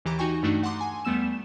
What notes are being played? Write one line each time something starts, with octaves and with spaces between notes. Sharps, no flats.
D#2 E3 G4 A#5 D6
D#4 F#4 G5 G#5 C#6
G2 A3 D4 D#4 F#4
F#5 A5 A#5 C6 D6 D#6
G#5
E2 G3 A3 B3 E6 E7